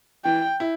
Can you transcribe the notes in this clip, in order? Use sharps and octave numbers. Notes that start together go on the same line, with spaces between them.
E3 G5
E4